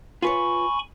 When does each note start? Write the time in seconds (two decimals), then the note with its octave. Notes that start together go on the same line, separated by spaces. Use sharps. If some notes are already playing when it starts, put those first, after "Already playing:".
0.22 F4 B4 C#5 G#5 B5 C#6